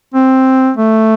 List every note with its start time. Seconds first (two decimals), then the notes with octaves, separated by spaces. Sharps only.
0.14 C4
0.77 A3